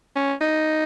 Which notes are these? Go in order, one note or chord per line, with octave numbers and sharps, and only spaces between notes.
C#4
D#4